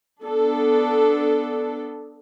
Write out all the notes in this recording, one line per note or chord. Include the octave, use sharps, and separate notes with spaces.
B3 D4 A4